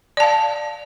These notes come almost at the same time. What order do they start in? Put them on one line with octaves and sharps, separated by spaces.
D5 A5 F5